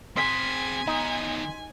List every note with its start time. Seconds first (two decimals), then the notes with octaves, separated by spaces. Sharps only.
0.16 C4 G#4 G#5 C6 B6
0.87 D#3 B3 D#4